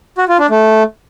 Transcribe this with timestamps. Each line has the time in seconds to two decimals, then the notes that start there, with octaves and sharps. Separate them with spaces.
0.18 F#4
0.29 F4
0.39 D4
0.50 A3